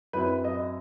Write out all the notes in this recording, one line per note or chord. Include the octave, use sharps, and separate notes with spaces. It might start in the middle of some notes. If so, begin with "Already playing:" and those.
F#2 F#3 C4 E4 B4
D#5